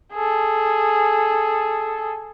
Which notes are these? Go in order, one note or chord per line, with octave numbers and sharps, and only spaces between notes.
G#4 A4